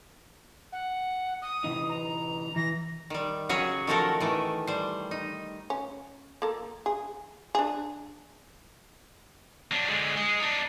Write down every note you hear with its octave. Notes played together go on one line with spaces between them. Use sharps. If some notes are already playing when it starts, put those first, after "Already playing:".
F#5
D#6
C3 E3 D#4
A#5
E3 A#6
D#3 G3
C#3 F#3 C#4 F#4 G#4 C#5
D#3 F3 A3 F#4 A4 A#4
D#3 E3 A3
G3 C5
D#4
C#4
A#3 A4 A#4
G#4
D4 G#4
F#3 D4
D3 G#3
G#3
D4 D#4